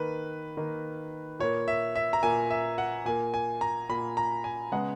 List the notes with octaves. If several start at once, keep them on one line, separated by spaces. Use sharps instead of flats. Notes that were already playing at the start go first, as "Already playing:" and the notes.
Already playing: D#3 A#3 B4
D#3 A#3
A#2 A#3 C#5
E5
E5
A#5
A#2 A#3 G#5
E5
F#5
A#2 A#3 G#5
G#5
A#5
A#2 A#3 B5
A#5
G#5
C#3 G#3 B3 F#5